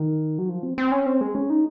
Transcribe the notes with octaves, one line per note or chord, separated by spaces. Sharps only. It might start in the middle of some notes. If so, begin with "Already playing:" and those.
Already playing: D#3
F#3
F3
C4
C4
C#4
C4
G#3
C#4
D#4